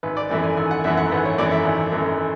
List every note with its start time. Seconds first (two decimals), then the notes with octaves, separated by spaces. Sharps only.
0.03 G#1 B4
0.17 D5
0.30 F#2 E3 A3 E5
0.43 G#5
0.57 G#1 G#5
0.71 F#5
0.84 F#2 E3 A3 E5
0.97 F#5
1.12 G#1 B4
1.25 C#5
1.38 F#2 E3 A3 D5
1.52 E5
1.65 G#1
1.92 F#2 E3 A3